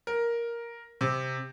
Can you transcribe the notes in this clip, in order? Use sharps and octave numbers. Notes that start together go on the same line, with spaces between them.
A#4
C3